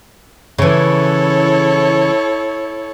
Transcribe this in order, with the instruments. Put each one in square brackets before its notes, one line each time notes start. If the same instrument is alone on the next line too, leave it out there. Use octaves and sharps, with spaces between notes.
[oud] C#3 E3 [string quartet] E4 A4 C#5